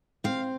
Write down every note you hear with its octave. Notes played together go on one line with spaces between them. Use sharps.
C4 F5